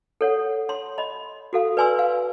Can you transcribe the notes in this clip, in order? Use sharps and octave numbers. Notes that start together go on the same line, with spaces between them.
A4 C#5 F#5
C#5 C6
D#5 B5
F#4 A4 F5
B4 D5 G#5 C6 E6
F5